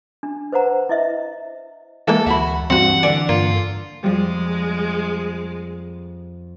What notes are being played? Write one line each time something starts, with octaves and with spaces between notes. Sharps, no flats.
D4
B4 C5 F#5 A#5
E4 D#5 E5
E3 G#3 A#3 A4
D2 F#4 E5 B5
G2 E3 C4 F#4 F#5
D3 D5 G#5
G2 A#3 F4
F2 F3 G3 G#3